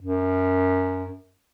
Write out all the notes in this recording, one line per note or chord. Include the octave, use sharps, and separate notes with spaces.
F#2